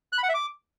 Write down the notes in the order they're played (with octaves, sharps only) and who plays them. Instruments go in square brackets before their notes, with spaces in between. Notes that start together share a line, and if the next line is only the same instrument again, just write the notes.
[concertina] F#6
B5
F#5
E5
D6